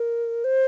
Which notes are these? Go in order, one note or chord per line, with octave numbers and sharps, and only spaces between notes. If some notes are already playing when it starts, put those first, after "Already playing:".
Already playing: A#4
C5